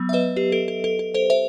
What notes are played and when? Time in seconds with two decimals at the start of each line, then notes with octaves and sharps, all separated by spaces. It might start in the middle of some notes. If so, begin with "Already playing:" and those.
Already playing: F#3 B3
0.09 E5
0.13 B4 D#5
0.36 G4 B4
0.52 A4
0.68 A4
0.84 A4
0.99 A4
1.14 A4 C5
1.30 C5 E5